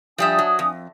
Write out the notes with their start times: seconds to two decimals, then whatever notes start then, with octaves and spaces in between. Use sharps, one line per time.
0.18 F3 G3 D4 E5 G#5 D#6
0.38 F#3
0.59 F2